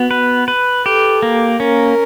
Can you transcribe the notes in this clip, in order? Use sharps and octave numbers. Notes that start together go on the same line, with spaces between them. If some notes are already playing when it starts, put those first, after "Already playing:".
Already playing: B3 F#4
B4
B4
G4 A4
A#3
C#4 A#4